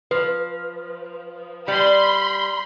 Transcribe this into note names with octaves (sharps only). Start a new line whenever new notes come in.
F3 B4
G3 B5 C6